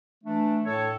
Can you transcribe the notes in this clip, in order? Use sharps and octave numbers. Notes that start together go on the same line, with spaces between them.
E3 A3 D4
A2 A4 C#5